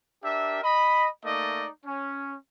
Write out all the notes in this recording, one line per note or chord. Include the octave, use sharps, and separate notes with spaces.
D4 G4 A#4 E5
D#5 B5
A3 A#3 D#4 D5 D#5
C#4